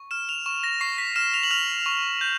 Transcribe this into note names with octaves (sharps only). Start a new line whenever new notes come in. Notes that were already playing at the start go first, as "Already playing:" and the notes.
Already playing: C#6
F6 E7
F7
C#6 E7
A#6
C#6 C7
B6
F6 E7
F7
F#7
F6 F7
C#6
G6